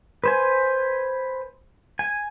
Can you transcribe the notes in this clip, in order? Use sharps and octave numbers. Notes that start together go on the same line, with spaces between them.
B4 C5 G#5
G#5